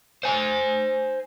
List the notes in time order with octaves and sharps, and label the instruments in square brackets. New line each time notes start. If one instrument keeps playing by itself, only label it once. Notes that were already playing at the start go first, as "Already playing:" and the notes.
[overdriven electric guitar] C5 G#5